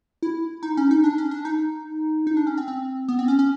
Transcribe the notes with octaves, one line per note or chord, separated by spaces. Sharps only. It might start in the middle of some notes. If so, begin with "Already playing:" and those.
E4
D#4
C#4
D#4
D4
C#4
D4
D#4
D#4
D4
C#4
C4
C4
B3
C4
C#4
C#4